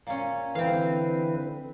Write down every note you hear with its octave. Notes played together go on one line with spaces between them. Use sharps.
A#2 C#4
D3 E3 C4 B4 F5